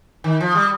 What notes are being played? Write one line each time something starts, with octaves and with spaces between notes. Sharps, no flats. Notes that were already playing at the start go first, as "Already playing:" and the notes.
D#3
F3
G3